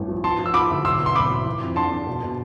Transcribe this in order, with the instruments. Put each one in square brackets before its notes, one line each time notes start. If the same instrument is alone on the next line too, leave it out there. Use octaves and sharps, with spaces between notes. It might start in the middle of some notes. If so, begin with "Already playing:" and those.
Already playing: [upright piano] A1 G2
F3
[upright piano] F3 [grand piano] A5 C6
[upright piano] F3
[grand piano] E6
[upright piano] F3 [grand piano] B5 D6
[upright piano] D2
[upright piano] B1 [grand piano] C6 E6
[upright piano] B3
[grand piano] C6
[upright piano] B1 [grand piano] B5 D6
[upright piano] A2
E3
F2
[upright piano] D4 [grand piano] A5 C6
[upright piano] D4
B2
B2